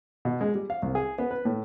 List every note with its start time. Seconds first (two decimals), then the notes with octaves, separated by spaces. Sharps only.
0.25 B2
0.41 G#3
0.55 G3
0.70 F5
0.82 C2
0.95 G#4
1.18 B3
1.31 B4
1.45 A2